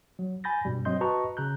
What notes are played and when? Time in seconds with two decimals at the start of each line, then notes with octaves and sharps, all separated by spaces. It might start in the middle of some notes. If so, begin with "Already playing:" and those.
0.19 F#3
0.44 G#5 B5 G6 A6 A#6
0.65 G2 B2 G3
0.85 F#3 C4 D#5 C6 G6
1.01 F#4 B4 D#5 A5 A#5 C#6
1.37 C#3 A#5 F#6 G6